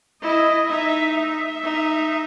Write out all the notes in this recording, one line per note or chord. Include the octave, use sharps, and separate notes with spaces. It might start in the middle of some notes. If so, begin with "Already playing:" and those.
E4 D#5
D#4 E5
E5
D#4